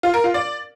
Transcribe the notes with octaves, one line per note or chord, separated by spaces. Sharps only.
F4
A#4
F4
D5